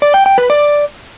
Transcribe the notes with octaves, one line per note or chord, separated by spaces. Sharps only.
D5
G5
G5
B4
D5